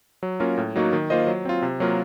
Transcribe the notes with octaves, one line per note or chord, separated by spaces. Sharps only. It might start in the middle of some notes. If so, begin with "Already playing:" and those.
F#3
A#3 C#4 F4 A#4
A2
F#3 A#3 D#4 F#4
D#3
A#3 F4 C5 D#5
F#3
C4 F4
C3
F#3 A#3 F4 A#4